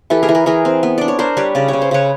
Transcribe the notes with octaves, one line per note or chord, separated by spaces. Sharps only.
E3 G4 A4
G#4 A#4
E3
G#4 A#4
E3 G#4 A#4
C4
B3
D4 D5
C#5
D4 A#4 C5
G3 B4 C#5
C#3 D5
C#3 C#5
C5
C#3 B4 C#5